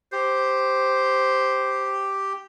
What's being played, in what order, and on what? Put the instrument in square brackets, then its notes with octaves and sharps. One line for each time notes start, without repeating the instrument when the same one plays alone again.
[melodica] G4 [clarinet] C5